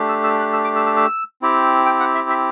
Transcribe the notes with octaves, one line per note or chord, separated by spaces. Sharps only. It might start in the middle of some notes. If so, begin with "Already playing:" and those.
Already playing: A3 D4 G4
E6
E6
F#6
E6
D6
E6
E6
E6
C4 E4 G4
G5
F#5
E5
E5